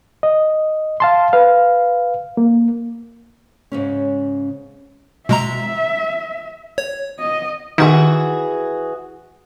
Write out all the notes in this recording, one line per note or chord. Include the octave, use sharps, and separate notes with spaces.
D#5
F5 A5 C6
B4 F5
A#3
G#2 C#3 C#4
B2 G#3 E5 A#5
C#5
D#5
D#3 E3 F#4 G#4